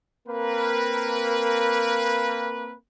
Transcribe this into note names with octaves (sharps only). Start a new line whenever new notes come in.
A#3 C4 A#4 B4